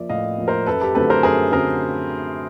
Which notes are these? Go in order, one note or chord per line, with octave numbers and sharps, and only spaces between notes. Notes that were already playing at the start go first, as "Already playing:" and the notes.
Already playing: F3 A#3 D5 E5
A2 D#5 F5
F3 A#3
A#4 C5
F#2 A4 B4
G4 A4
D3 F#3 A3 C4 A4 B4
A#4 C5
F#2 G#4 A#4
D3 F#3 A3 C4 G#4 A#4